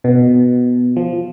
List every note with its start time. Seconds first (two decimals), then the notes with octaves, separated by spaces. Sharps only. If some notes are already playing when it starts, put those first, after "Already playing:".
0.04 B2
0.96 F3